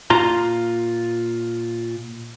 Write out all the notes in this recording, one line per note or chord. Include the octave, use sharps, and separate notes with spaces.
A#2 F4 A#5 C6